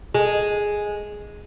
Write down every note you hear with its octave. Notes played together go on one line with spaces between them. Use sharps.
G#3